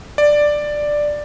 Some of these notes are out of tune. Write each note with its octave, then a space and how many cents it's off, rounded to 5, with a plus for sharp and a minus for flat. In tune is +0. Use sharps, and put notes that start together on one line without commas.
D5 +5